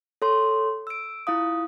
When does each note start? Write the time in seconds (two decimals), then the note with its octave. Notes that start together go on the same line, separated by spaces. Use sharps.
0.22 A4 C#5 C6
0.87 E6 D7
1.27 E4 F4 F5 D#6